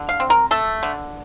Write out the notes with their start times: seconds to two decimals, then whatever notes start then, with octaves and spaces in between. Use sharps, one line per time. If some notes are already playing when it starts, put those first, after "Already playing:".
Already playing: D3
0.09 F5
0.20 C4
0.30 A#4
0.51 A3 A4
0.83 D3